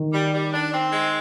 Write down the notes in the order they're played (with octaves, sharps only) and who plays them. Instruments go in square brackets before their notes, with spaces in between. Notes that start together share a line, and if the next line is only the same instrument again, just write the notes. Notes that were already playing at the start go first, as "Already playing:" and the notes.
Already playing: [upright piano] D#3
[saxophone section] G3
G3
D4
C4
G#3